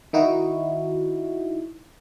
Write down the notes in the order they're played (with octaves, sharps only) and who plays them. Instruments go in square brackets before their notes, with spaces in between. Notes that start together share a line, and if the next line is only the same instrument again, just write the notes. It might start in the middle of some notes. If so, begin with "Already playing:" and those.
[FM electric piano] D#3 D#4 E4 F#4